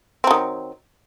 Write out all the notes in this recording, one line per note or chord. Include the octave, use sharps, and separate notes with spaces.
D#3 F#3 C4